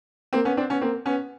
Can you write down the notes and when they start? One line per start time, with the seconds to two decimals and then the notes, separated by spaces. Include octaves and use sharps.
0.33 A#3 C4
0.45 B3 C#4
0.57 C4 D4
0.70 B3 C#4
0.81 A#3 C4
1.05 B3 C#4